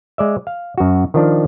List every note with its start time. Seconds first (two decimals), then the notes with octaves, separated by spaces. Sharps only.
0.18 G#3 D5 E5
0.47 F5
0.78 F#2 F#4
1.14 D#3 F3 D4